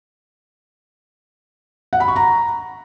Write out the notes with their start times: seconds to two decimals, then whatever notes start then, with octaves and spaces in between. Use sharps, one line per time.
1.93 F#5
2.00 B5
2.08 C#6
2.16 A#5